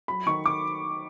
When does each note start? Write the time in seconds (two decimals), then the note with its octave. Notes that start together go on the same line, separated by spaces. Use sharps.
0.08 F#3 B5
0.26 D#3 C#6
0.46 D6